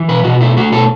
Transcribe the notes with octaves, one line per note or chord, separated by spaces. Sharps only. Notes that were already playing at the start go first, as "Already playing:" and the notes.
Already playing: E3
B2 B4
B2 F#4
A3 E4
A3 F#4
B2 A4